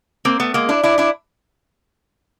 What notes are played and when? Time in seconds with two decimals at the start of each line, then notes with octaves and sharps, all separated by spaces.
0.25 A#3 C4
0.40 A3 B3
0.54 G#3 A#3
0.69 D4 E4
0.83 D4 E4
0.98 D4 E4